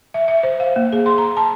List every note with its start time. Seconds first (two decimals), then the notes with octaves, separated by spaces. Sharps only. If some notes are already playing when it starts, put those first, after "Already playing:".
0.14 E5
0.28 E5
0.43 C5
0.60 F5
0.76 A#3
0.92 G#4
1.06 C6
1.18 A#5
1.37 A5